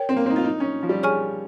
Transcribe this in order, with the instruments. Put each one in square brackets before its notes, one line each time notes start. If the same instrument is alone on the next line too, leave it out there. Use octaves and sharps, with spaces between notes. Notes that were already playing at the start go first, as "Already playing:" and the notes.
Already playing: [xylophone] A#4 C#5 G5
[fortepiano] C4
A#3
C4 D#4
F4
D#4
C#4
F3
G3
[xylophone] G#4 C#5 G#5 C#6 F6